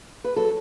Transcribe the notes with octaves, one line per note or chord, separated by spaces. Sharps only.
B4
F#3 A4